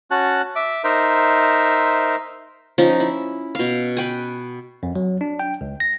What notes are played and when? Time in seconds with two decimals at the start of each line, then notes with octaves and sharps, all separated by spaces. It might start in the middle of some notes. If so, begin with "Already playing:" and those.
0.11 C#4 F#4 A5 F#6
0.56 E5 D6
0.84 D#4 A#4 C5 E5
2.78 F3 C#4 D#4
3.00 E4
3.55 B2 F5
3.97 B4 G5 G#5
4.83 F2
4.95 F#3
5.21 D4
5.40 G5
5.61 C#2
5.80 A#6